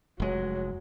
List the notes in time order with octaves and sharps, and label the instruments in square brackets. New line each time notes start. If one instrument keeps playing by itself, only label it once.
[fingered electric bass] F1 G#3 [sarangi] F#3